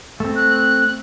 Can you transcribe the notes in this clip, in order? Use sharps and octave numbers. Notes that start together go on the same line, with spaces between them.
A3 C4
F#6